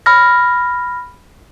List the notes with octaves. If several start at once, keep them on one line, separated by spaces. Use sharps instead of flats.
B5 F6 A#6